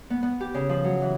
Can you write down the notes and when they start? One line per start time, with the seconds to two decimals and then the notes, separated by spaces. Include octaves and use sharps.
0.10 B3
0.23 B3
0.41 G4
0.54 C#3
0.69 F3
0.84 F#3
1.02 E3